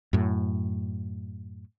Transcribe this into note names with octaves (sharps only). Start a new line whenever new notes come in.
F#2 A2